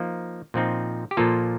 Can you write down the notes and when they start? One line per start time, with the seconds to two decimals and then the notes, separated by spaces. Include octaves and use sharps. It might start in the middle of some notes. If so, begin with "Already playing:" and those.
Already playing: F3 A#3 D#4
0.54 A#2 F3 C4 D#4
1.11 G4
1.17 A#2 F3 A#3 F4 A4